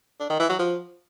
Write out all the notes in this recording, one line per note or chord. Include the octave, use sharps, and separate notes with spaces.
D4
D#3
E3
F#3
F3